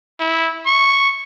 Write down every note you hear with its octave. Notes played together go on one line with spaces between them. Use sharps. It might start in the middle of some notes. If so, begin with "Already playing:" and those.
E4
C#6